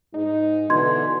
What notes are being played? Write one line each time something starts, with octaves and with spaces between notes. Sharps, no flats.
G#2 D#4
B2 D3 E3 C6 G#6